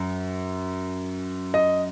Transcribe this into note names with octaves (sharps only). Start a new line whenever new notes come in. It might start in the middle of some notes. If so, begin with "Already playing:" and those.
Already playing: F#2
D#5